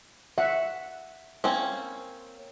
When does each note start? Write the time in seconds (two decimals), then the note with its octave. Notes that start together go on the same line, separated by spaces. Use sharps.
0.38 F#4 E5 F#5
1.44 A#3 C4 C#4